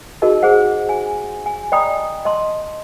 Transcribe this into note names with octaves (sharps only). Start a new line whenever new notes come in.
D#4 F#4 G#4 A#4 D#5 A5
G#4 C5 F#5
G#5
G#5
D5 D#5 G5 A#5 B5 D#6
D#5 A5 C6